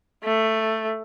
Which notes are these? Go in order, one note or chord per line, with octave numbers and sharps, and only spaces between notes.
A3